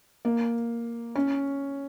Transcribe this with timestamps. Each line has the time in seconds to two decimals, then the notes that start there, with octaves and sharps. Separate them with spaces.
0.25 A#3
1.16 C#4